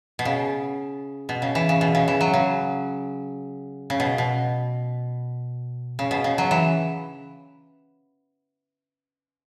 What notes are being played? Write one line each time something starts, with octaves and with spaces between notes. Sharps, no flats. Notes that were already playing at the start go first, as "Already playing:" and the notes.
B2
C#3
B2
C#3
E3
C#3
B2
C#3
E3
F#3
C#3
C#3
B2
B2
C#3
B2
C#3
F#3
E3